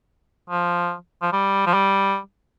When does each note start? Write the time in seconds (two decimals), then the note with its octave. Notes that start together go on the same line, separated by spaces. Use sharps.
0.50 F3
1.22 F3
1.33 G3
1.66 F3
1.74 G3